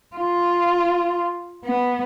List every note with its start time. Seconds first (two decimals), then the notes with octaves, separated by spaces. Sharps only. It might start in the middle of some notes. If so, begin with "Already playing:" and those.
0.16 F4
1.64 B3